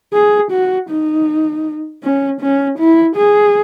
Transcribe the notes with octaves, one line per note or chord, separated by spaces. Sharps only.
G#4
F#4
D#4
C#4
C#4
E4
G#4